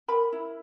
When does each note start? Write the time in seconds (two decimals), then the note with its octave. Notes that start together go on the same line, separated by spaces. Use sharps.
0.08 A#4 B5
0.33 E4